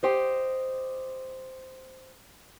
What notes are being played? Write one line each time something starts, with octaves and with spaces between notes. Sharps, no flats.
G4 C5 D#5